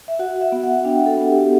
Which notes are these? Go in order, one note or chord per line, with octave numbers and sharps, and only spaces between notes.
E5
F#4 F#5
E5
B3
F#5
D4 G5
A4
B3
G4
G4